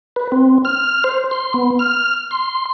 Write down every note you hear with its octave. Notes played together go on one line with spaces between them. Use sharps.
B4
C4
F6
C5
C6
B3
F6
C6